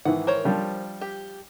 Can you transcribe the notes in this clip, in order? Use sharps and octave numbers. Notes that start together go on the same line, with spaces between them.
G#2 D#3 E3 F#5
A#4 C5 C#5
F3 G3 D4
G4